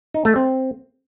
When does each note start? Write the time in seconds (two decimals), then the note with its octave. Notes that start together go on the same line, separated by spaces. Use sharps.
0.14 D#4
0.25 A3
0.36 C4